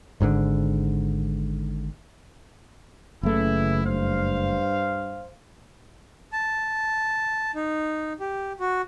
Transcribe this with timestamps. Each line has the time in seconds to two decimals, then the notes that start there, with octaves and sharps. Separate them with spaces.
0.20 G#1 G#2 B2 D3
3.23 F#1 C#3 E3 A3 E4
3.84 G2 C5 F5
6.33 A5
7.55 D#4
8.20 G4
8.60 F#4